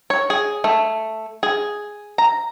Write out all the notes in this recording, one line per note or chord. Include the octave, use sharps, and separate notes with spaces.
C#5
G#4
A3
G#4
A#5